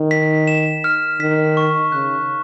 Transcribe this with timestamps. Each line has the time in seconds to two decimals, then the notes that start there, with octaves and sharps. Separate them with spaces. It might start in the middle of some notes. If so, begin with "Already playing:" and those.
Already playing: D#3
0.11 B6
0.47 E7
0.84 F6
1.20 D#3 B6
1.57 C#6
1.92 C#3 F#6